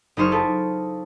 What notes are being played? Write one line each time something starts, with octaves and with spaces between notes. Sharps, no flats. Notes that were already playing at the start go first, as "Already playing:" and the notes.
F#1 D#4 G#4 C5 C#6 F6
E4 F4 A4